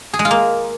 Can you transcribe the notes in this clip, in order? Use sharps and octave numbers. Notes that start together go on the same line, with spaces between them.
G#4
G#3
F4
A#3